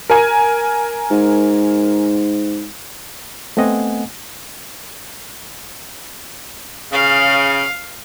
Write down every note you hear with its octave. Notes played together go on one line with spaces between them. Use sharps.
A#4 G#5
G#2
A3 B3 C4 D#5 F#5 G#5
C#3 F5